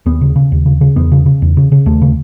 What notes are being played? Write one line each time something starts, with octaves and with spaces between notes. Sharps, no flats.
D#2 B3
C#3
C#3
D#2
C#3
C#3
E2 B3
C#3
C#3
E2
C#3
C#3
D#2 A3
C#3